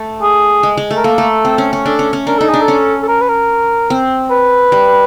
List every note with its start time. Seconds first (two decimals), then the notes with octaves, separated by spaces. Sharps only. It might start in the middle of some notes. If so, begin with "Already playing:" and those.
Already playing: A3
0.22 G#4
0.63 G#3
0.77 G#3
0.91 A3
0.97 A#4
1.04 A#3 A4
1.18 A3
1.45 C4
1.58 C#4
1.73 C#4
1.86 D4 A4
1.99 C#4
2.13 C#4
2.27 D4 A#4
2.38 D#4 A4
2.49 D4 G#4
2.62 A4
2.68 C#4
3.02 A4
3.08 A#4
3.21 B4
3.28 A#4
3.90 C4
4.31 B4
4.72 G3